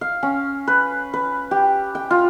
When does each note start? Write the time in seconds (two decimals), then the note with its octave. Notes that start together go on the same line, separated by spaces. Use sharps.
0.01 F5
0.23 C#4
0.67 B4
1.14 B4
1.51 G4
1.95 G5
2.11 F4